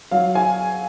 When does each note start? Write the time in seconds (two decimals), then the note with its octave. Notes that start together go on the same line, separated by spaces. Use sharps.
0.11 F#3 F5
0.35 G#5